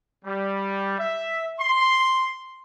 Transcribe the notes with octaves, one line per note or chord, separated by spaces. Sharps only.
G3
E5
C6